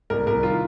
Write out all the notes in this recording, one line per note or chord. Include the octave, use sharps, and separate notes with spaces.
C2 A#4
C2 A#4
D#3 F4